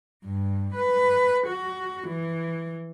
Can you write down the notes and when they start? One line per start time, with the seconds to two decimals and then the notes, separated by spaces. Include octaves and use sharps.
0.24 G2
0.74 B4
1.47 F#4
2.06 E3